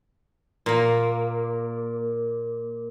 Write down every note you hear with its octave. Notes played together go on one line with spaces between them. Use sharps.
A#2 A#3